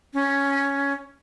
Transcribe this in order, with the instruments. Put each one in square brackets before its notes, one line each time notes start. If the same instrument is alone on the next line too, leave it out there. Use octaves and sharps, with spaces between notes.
[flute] C#4